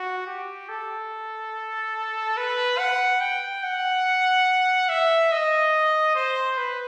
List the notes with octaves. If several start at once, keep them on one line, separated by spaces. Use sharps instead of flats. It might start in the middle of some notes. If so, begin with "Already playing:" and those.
Already playing: F#4
G4
A4
B4
F#5
G5
F#5
E5
D#5
C5
B4